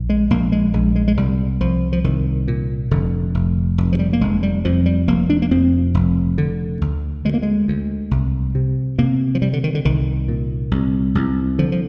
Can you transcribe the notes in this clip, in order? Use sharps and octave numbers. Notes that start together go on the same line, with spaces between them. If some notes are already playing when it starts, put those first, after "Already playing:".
Already playing: A#1
G#3
A#1 A#3
G#3
A#1 G#3
G#3
G#3
C2 G3
C2 F3
F3
C2 D#3
A#2
F1 D3
F1
F1
F3
G3
A#3
F1 G#3
G3
F2 F3
G3
F1 A#3
D4
A#3
F2 C4
F1
D3
D2
D2 G#3
A#3
G#3
D2
C2
C3
C3 A#3
F3
C3 G3
D3
D#3
D3
C2 D#3
A#2
C2
C2
D3 F3
F3